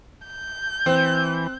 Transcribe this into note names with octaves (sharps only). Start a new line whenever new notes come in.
G6
E3 C4